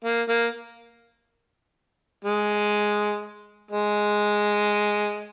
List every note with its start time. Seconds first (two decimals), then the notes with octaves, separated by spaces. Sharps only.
0.04 A#3
0.29 A#3
2.24 G#3
3.71 G#3